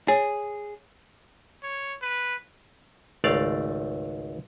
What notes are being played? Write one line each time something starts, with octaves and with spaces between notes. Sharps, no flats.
G#4 C#5
C#5
B4
G#1 C#2 A3 D5 F5